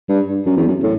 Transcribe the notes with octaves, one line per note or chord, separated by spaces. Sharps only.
G2
F#2
E2
F#2
A2